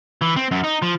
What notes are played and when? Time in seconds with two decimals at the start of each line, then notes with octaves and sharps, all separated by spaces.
0.22 E3
0.36 C4
0.51 F#2
0.64 D#4
0.82 F3